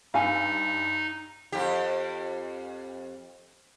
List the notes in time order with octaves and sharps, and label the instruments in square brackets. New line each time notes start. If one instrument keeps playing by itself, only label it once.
[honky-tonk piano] G2 E6 C7 [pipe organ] D#4 [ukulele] F5 G#5
[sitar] F2 G4